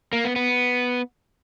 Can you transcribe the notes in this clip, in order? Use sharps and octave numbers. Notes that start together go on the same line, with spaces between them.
A#3
B3
B3